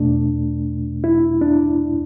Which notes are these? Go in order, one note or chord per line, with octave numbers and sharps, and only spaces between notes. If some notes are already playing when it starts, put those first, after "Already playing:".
Already playing: E2 B2 A3 D4
E4
D4